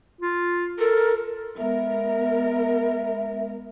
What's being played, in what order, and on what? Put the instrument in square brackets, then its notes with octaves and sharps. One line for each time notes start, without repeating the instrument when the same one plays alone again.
[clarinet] F4
[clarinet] A4 [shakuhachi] A#4
[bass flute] G#3 [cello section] B3 A#4 [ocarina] E5